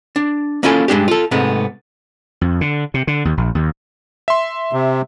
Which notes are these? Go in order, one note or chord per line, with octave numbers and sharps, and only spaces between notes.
D4
A#3 C#4 E4 F4 A4 G#5
G2 G#3 D4 G4
F4 A4
G#2 C3 G#3 A3 B3
F2
D3
C3
D3
D#2
A#1
D#2
E5 C6
C3